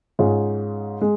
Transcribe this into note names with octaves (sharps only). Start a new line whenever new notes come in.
G#2 G#3 C#4 F4
G#3